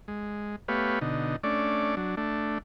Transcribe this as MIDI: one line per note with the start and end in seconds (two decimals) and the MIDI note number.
0.08 0.56 56
0.68 0.99 57
0.68 0.99 59
0.68 0.99 67
0.68 0.99 71
0.68 0.99 73
0.68 0.99 77
1.01 1.36 47
1.01 1.36 50
1.01 1.36 63
1.44 1.95 57
1.44 1.95 61
1.44 1.95 62
1.44 1.95 74
1.97 2.15 54
1.97 2.15 62
2.17 2.58 57
2.17 2.58 62